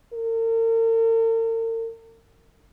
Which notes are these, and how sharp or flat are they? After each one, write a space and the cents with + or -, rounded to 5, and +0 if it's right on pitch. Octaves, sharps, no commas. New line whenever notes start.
A#4 -45